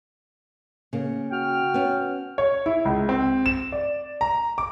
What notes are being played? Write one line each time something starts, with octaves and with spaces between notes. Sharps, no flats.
C#3 A#3
F#4 G5 F6
B3 C#4
C#5
E4
C#2
C4
E7
D5
A#5
D6